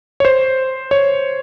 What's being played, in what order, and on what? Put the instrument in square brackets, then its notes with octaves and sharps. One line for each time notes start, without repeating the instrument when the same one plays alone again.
[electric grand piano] C#5
C5
C#5